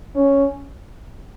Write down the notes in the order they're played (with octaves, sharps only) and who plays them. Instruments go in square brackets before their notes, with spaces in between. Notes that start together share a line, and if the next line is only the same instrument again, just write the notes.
[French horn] C#4